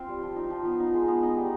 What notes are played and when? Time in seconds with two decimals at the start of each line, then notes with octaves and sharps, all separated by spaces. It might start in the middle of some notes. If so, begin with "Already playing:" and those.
Already playing: C4 F4 F5
0.08 G3
0.23 F3
0.36 D#4
0.50 F3
0.65 B3
0.80 D#4
0.94 G#3
1.08 B3
1.23 D#4
1.37 G3